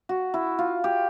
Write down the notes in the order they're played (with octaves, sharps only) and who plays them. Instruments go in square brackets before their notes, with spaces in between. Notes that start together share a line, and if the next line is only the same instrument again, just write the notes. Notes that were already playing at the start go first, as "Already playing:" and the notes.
[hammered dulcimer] F#4
E4
F4
G4